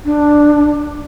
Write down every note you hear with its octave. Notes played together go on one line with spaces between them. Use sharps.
D4